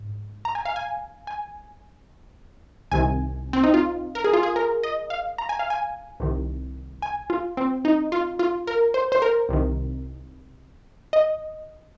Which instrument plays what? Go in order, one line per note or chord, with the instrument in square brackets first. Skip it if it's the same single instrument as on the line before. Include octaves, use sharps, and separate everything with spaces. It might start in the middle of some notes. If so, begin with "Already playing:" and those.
Already playing: [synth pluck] G#2
A#5
G#5
F5
G#5
G#5
C2 C3 D#3 G#5
C4
D#4
F4
A#4
G#4
F4
G#4
A#4
D#5
F5
A#5
G#5
F5
G#5
C2 C3 D#3
G#5
F4
C4
D#4
F4
F4
A#4
C5
C5
A#4
C2 C3 D#3
D#5